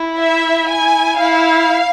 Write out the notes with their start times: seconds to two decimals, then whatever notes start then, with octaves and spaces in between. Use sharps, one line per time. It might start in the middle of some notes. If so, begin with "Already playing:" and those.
Already playing: E4
0.17 E5
0.68 G#5
1.19 E4 F5